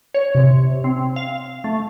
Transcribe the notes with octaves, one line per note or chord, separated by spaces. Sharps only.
C#5
C3
C4
F5
A3